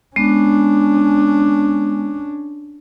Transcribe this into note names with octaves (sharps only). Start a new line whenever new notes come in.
G#3 B3 C#4 D4